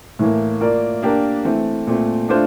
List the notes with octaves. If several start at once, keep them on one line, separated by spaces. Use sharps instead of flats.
A2 E3 A#3
A#3 F4 A#4 D5
A#3 D4 G4 A#4
E3 A3 C4
A#2 A3 C4
A3 D4 F4 C5